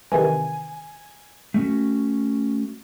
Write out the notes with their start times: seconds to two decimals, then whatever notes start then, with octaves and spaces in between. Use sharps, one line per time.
0.12 C3 D#3 E3 G#5
1.54 A3 C#4 F#4